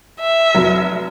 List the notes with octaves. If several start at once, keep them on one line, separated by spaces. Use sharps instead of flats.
E5
F1 F#3